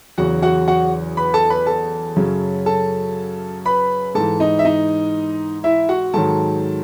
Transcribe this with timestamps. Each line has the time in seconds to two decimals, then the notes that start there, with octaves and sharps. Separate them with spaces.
0.18 E2 C#3 F#3 F#4 F#5
0.42 F#4 F#5
0.68 F#4 F#5
1.17 B4 B5
1.34 A4 A5
1.50 B4 B5
1.66 A4 A5
2.16 F#2 C#3 F#3
2.66 A4 A5
3.65 B4 B5
4.15 G#2 E3 A4 A5
4.40 D#4 D#5
4.59 E5
4.65 D#4 D#5
5.64 E4 E5
5.89 F#4 F#5
6.14 G#2 D#3 F#3 A4 A5